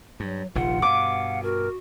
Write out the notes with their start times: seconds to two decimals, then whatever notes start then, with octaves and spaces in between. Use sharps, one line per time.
0.20 G2 F#3
0.55 F1 A#1 D#3 F4 F#5
0.82 G2 B2 F5 D6
1.43 F#4 A#4